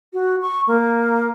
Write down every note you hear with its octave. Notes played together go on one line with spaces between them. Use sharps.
F#4
C#6
A#3